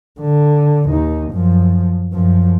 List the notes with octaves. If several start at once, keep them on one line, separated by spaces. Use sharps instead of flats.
D3
D#2 D#4
F#2 F3
F#2 F3